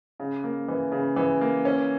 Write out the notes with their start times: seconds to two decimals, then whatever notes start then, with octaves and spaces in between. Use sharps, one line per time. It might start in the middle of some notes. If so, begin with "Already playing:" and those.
0.20 C#3
0.44 A#3
0.68 E3
0.92 C#3
1.16 E3
1.41 A#3
1.65 C#4